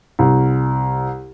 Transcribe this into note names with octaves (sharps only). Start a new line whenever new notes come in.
C2